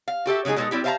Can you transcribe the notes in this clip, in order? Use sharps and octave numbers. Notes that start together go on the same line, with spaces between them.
F5
F#4 G4 A4 E5
C#3 F#3 G#3 D#4 G#4
B2 G3 G#3 B3 D#4 A4
G3 C4 E4 G4
C5 E5 F5 G5 A5 A#5